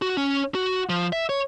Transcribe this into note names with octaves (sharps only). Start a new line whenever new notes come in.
F#4
C#4
F#4
F3
E5
C#5